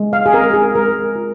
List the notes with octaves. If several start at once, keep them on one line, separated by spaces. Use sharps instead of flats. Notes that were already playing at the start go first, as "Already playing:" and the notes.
Already playing: G#3
F5
G#4
C4 A#4
G#4
G#3 A#4
F4